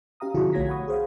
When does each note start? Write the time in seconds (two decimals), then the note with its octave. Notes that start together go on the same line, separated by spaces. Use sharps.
0.20 C#4 G4 F5 A#5 D#6
0.34 B2 D3 F3 E4 F#4 G#4
0.53 B1 A3 C#5 G#6 A#6 B6
0.69 F#5 B5 C#6 D#6
0.88 G#4 C5 F5